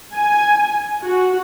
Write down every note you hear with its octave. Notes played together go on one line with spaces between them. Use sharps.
G#5
F#4